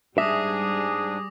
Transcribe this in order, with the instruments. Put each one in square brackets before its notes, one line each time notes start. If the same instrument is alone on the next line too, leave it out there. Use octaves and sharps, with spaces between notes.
[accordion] G#2 D4 [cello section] G3 G#4 [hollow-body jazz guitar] E5 [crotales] D6 D#6 A#6